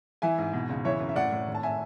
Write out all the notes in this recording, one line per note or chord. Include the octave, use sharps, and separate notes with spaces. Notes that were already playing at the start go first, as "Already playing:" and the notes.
E3 E5 G#5
G#2
B2
C#2
E3 C#5 E5
F#2
E5
A2 D5 F#5
A2
G#1
A5
E5 G#5